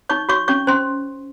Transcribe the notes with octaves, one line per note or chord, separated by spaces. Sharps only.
D#4 C#5 C#6
F#4 C#5 C#6
C#4 C#5 C#6
C#4 C5 C6